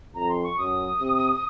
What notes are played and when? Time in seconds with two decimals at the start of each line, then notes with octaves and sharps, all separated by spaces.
0.15 F2 A#5
0.29 C6
0.43 C#6
0.57 F#2 D#6
1.00 C3